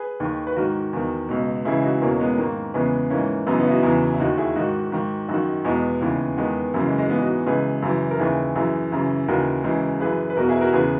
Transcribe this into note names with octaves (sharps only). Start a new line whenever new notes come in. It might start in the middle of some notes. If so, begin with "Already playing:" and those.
Already playing: G#4 B4
D#2 D#3
B4
G#2 D#3 F#4 A#4
E2 D#3
C#2 B2
C#2 C#3 E3 E4 G#4
D#4 F#4
E2 B2 A#3 C#4
G#3 B3
G#2 D#3 A#3
E2 C#3 E3 G#3 B3
G#2 E3 A#3 C#4
F#2 C#3 E3 B3 D#4
B3 D#4
E4
D#4 F#4
E2 C#3 E3
E4
D#2 D#3 D#4 F#4
E4 G#4
G#2 D#3 D#4 F#4
G#2 D#3
F#2 D#4 F#4
D#3
E2 B2 G#3 B3
D#2 C#3 E3
E2 D#3 G#3 B3
F#2 C#3 E3 A#3
G#3
G#3
G#2 E3 G#3 B3
D#4 F#4
C#2 C#3 E3 G#4 B4
F#2 C#3 E3
A#4
D#2 C#3 E3 E4 G#4
F#2 E3 E4 G#4
F#2 C#3 E3
D#2 C#3 E3 F#4 A#4
C#2 C#3 E3
F#2 E3 G#4 B4
B4
E2 B2 F#4 A#4
E4 G#4
B4
F#4 A#4
E2 C#3 E3 G#4 B4